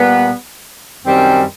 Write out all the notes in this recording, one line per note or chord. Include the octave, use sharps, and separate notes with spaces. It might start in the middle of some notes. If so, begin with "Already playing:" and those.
Already playing: A#2 G3 B3
F#2 D#3 G3 C4